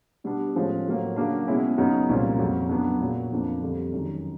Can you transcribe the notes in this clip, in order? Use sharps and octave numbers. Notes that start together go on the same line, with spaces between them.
B2 G3 B3 D4
A2 F3 G#3 C#4
A2 F#3 A#3
C#3 F#3 A#3 D4
B2 G#3 C#4 E4
F#2 C#3 F#3 B3 D#4
C2 A#2 F3 A#3 C#4
F2 C#3 F#3
F#2 C#3 F#3 B3 D4
A#2 F#3 A#3
F2 C#3 F3 A#3 D4
F2 D3 G3
F#2 D#3 G#3